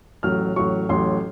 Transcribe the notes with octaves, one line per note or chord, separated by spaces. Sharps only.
A1 A2 F#3 F6
A1 A2 F#3 C#6
A1 A2 F#3 C6